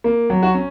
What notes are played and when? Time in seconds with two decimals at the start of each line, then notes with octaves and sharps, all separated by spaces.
0.04 A#3
0.30 F#3
0.43 F#4
0.55 C#4